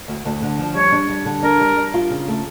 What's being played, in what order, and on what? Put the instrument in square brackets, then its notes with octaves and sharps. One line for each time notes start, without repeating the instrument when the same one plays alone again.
[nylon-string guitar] D2
D2
D3
F3
[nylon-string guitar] G3 [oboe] C#5
[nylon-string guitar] D4
G3
D3
[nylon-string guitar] D4 [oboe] A#4
[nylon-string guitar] G3
G3
F4
C#3
A3